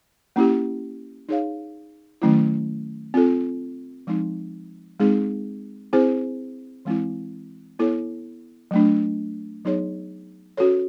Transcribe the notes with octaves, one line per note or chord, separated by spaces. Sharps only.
A#3 C#4 E4 G4
D#4 G#4 C#5 F5
D#3 F#3 A3 C#4 E4
C4 F4 A4
F3 G#3 C4 D#4
G#3 C4 D#4 G#4
C4 E4 G#4 C5
E3 G#3 C4 E4
B3 E4 A4 C#5
F#3 A3 D4
F#3 B3 D#4 G#4 C#5
C#4 F#4 A4 C#5